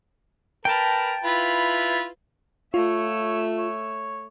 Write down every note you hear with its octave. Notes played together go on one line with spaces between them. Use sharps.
A#4 B4 G5 A5
E4 F4 B4
A3 F4 C#5 E5
C#5